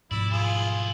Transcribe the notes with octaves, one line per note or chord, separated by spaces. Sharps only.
G#2 B2 F3 E4 D5
B1 E4 F4 G#4